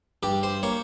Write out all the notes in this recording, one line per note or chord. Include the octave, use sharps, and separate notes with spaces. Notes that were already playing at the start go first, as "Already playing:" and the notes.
G2 G4
C5
A#3 C#5